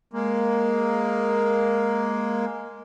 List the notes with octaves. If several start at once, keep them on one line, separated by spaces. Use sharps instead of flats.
G#3 A#3